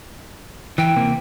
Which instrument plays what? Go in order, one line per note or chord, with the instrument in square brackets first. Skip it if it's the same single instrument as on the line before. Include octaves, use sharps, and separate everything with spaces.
[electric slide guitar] E3 [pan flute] G5
[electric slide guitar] C3 A#3